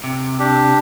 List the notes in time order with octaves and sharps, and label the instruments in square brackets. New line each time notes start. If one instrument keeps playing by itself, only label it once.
[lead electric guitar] C3
[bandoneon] D4 G4